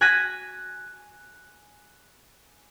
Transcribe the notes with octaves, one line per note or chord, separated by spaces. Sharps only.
G#5 F#6 G#6 A#6 B6 D#7